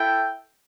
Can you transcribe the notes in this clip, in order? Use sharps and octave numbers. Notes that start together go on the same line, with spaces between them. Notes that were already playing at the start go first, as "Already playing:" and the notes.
Already playing: E4 A4 E5 G5